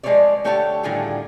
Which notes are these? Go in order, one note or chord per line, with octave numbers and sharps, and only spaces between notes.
F3 G#3 A#3 B4 C#5 D5
D3 A3 G4 C#5 G5 A5
A2 D3 D#3 G3 F4 G#4